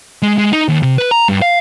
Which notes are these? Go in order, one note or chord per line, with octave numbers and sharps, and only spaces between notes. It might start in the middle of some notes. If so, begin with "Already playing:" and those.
G#3
G#3
D#4
D#2
C3
B4
A#5
G2
F5